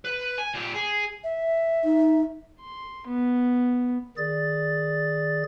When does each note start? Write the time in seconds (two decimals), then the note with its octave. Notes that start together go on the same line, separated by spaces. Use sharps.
0.05 B4
0.38 G#5
0.54 A#2 G4
0.74 G#4
1.24 E5
1.84 D#4
2.61 C6
3.07 B3
4.17 D#3 G#4 D5 A6